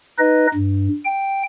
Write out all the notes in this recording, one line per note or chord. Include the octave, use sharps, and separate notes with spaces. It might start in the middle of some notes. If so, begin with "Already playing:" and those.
D#4 B4 D#5
G2
G5